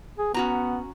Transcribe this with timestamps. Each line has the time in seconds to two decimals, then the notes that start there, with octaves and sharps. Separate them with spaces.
0.18 G#4
0.34 B3 C#4 F#4 A#5